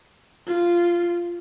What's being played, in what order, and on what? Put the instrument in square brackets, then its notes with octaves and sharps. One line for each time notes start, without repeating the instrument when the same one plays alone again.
[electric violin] F4